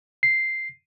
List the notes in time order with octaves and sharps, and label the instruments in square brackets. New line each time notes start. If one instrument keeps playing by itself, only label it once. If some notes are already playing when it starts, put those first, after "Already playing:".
[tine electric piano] C7